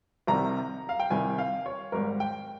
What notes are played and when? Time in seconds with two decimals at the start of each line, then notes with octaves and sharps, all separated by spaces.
0.27 C2 C3 D#3 G3 A#5
0.89 F5
1.00 G5
1.10 C2 C3 D#3 G3 G#5
1.38 F5
1.66 C#5
1.92 G#1 G#2 G3 A#4
2.20 G5